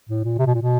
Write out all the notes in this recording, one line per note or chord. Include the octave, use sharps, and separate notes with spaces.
A2
A#2
C3
B2
A#2
B2